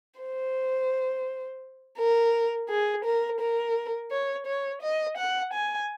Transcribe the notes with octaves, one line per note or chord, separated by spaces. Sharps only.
C5
A#4
G#4
A#4
A#4
C#5
C#5
D#5
F#5
G#5